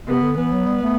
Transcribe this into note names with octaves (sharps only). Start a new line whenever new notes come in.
C3 B3
D3
E3 B3
F#3
G3
A3